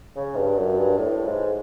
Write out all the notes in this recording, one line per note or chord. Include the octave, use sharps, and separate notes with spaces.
C#3
G2
F#2
G2
A2
G#2